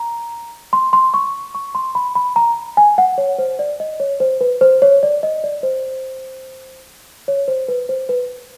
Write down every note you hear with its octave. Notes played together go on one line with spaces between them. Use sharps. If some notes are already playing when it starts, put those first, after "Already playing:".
Already playing: A#5
C6
C6
C#6
C#6
C6
B5
B5
A#5
G#5
F#5
C#5
C5
D5
D#5
C#5
C5
B4
C5
C#5
D5
D#5
D5
C5
C#5
C5
B4
C5
B4